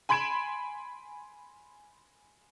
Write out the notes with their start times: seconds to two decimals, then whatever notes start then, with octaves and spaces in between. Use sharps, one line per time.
0.09 G#5 B5 C6 G#6 D7 E7